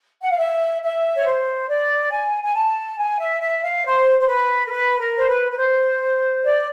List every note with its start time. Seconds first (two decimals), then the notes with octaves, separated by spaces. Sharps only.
0.21 F#5
0.30 F5
0.38 E5
0.82 E5
1.16 C#5
1.24 C5
1.68 D5
2.10 G#5
2.43 G#5
2.55 A5
2.98 G#5
3.19 E5
3.41 E5
3.62 F5
3.84 C5
4.19 C5
4.26 B4
4.65 A#4
4.70 B4
4.99 A#4
5.17 C5
5.27 B4
5.51 B4
5.57 C5
6.43 D5